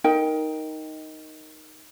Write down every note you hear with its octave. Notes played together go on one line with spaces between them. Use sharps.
D#4 A#4 G5